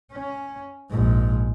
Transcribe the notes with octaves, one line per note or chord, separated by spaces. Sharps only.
C#4
A#1 G#2